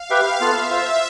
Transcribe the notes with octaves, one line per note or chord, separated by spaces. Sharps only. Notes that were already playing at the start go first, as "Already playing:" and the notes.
Already playing: F5
G4 B4 E5 G5
B3 F4 A4 E5
F4 C5 F5